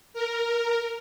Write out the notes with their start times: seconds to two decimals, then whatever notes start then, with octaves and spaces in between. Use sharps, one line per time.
0.13 A#4